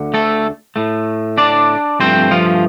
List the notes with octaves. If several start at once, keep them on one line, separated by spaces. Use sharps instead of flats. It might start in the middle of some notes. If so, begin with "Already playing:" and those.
Already playing: D2 D3
A3 A4
A2 A3
D4 D5
G2 F3 A3 C4 C5
F3 F4